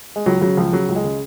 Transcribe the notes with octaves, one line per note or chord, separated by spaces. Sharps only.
G#3
C#2 F#3
C#3 F#3
C#2 F3
C#3 F#3
C#2
G#3
C#3